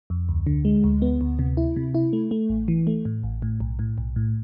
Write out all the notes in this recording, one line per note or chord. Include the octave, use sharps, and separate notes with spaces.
F2
D2
D3
G#3
D2
B3
D2
C3
E4
C3
E4
A3
A3
A1
E3
A3
A2
A1
A2
B1
A2
B1
A2